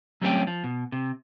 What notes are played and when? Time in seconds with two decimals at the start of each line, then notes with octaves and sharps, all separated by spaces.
0.21 F#3 G3 A3 C4 C#4 G4
0.47 F3
0.64 B2
0.92 C3